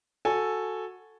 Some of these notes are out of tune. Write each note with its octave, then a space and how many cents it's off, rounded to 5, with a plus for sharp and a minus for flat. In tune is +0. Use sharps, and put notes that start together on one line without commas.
F#4 -5 A4 +0 G#5 +5